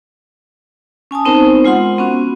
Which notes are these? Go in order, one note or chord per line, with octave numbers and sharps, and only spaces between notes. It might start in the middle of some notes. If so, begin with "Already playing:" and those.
C#4 G#5 A5 D#6
B3 C4 D#4 A#4 C5
G#3 F4 F#5 C6
B3 C#4 F#4